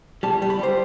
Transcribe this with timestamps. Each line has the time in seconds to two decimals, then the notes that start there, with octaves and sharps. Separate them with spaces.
0.23 G3 A5
0.42 G3
0.50 B5
0.59 G3 C5